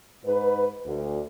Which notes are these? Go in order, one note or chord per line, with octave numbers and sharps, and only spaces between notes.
G#2 B4
D2